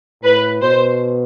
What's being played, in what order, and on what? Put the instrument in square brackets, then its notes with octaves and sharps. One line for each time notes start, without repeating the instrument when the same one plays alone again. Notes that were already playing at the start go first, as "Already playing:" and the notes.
[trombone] A2 [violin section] B4
[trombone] B2 [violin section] C5